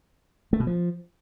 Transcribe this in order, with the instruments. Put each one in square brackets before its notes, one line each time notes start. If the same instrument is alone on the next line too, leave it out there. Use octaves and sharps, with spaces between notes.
[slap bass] A3
B2
F3